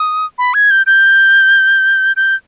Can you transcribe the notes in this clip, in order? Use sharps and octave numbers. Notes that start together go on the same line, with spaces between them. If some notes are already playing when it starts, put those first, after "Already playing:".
Already playing: D#6
B5
G#6
G6
G6
G6